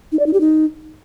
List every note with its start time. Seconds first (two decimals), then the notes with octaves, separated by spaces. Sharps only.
0.12 D#4
0.19 D5
0.26 D#4
0.33 G4
0.40 D#4